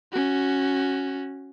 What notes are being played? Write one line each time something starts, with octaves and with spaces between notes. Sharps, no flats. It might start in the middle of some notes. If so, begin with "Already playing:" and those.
C#4 F#4